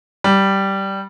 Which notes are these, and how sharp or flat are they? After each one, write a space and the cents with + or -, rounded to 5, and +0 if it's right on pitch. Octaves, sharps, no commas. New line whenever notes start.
G3 -10